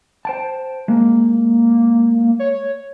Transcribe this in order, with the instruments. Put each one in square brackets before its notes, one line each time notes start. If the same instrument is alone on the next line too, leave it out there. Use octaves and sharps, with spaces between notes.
[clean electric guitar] C5 G5 A5
[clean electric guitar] G#3 [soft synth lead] A#3
[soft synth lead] C#5